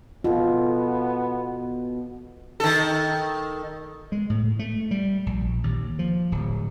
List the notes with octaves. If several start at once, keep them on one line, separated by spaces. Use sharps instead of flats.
B2 B3 F4 A4
D#3 A4
G#3
A2
A3
G3
A#1
D#2
F3
D1